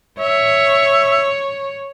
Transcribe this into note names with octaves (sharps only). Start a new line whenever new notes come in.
C#5 E5